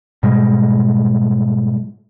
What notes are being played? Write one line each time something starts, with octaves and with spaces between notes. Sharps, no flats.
G#2 B2 G3 G#3